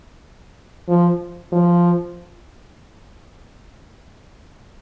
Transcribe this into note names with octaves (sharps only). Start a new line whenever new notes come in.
F3
F3